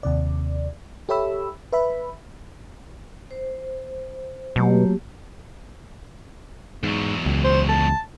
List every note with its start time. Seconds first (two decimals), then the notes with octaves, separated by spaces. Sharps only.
0.03 D#2 C3 D5
1.09 G4 A4 C#5 E5 B5 E6
1.72 B4 E5 B5
3.31 C5
4.56 B2 F#3 A3 A#3 G4
6.83 E2 G#2 F#3
7.26 C#2
7.44 C5
7.69 A5